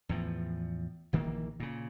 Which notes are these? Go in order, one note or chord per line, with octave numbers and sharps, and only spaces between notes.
E2 A2 F3
A#1 D#3 E3 A#3
A#2 C#3